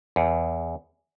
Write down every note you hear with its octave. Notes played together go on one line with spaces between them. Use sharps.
E2